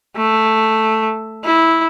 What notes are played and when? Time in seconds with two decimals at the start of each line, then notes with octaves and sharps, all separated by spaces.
0.16 A3
1.44 E4